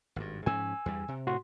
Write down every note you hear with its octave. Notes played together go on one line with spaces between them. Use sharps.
G#1 G2
G#2 F3 C#4 G#5 E6
E2 G2 G3
C3
A2 F#4 C6